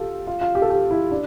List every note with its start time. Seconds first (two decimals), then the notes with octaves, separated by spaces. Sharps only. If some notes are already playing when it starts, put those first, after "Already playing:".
Already playing: F4 G4 A4
0.27 F4
0.41 F4
0.55 G4
0.62 A4
0.70 G4
0.91 E4
1.11 D4